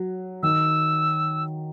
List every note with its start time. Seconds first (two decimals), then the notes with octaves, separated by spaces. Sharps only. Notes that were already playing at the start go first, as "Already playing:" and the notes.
Already playing: F#3
0.43 D#3 E6